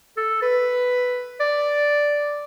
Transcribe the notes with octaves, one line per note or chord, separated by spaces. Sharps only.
A4
B4
D5